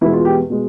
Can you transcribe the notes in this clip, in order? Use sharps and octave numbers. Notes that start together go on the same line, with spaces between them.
E2 B2 G#3 E4
F4
G4
B2 G#3